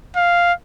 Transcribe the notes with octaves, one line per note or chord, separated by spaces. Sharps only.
F5